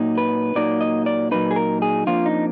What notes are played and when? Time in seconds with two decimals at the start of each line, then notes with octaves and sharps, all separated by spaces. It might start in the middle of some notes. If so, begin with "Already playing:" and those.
Already playing: A#2 F#3 A#3 D#4
0.18 B4
0.55 A#2 F#3 A#3 D#4 D5
0.81 D#5
1.06 D5
1.31 A#2 F#3 A#3 D#4 B4
1.51 G#4
1.56 A#4
1.82 G#4
2.07 F2 F3 A#3 D4 F4
2.26 D#4